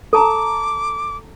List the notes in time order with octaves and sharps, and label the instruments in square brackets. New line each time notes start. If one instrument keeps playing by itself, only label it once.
[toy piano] A4 A5 A#5 [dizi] D6